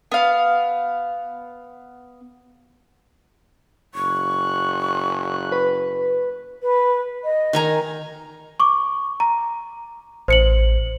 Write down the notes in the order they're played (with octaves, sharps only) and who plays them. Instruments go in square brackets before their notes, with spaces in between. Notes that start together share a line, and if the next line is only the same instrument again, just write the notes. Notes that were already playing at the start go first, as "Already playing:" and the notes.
[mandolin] B3 F5
[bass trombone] F#1 [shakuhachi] C#6 [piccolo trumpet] F#6
[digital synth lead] B4
[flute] B4
D#5
[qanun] D#3 G#5 A#5
[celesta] C#6 D6
A#5
[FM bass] A1 [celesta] C5 C#7 F#7